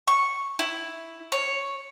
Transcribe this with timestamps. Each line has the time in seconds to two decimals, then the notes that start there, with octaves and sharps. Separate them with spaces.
0.08 C#6
0.59 E4
1.32 C#5